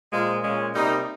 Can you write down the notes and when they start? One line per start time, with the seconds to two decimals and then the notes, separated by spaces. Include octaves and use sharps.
0.11 A#2 F3 G#3
0.42 A#2 G#3 C#4
0.74 C3 G3 A#3 D#4